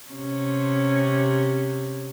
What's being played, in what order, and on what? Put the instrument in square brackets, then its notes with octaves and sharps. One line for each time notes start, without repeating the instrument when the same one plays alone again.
[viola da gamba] C3 C#4